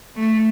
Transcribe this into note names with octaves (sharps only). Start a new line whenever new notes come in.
A3